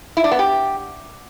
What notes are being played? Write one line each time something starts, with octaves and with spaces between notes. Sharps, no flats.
E4
D4
B3
G4